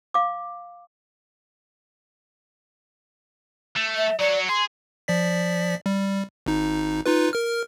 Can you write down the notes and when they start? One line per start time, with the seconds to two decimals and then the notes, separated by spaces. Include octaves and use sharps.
0.14 F5 D6
3.76 A3
3.96 E5
4.19 F#3 C#5 D5
4.49 G#4 C6
5.08 F3 D5 B6
5.86 G3
6.46 G#1 D#4
7.06 D#4 F4 B4
7.33 A#4 F6